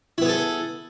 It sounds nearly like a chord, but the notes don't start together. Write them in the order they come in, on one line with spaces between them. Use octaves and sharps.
E4 B3 G#4 A4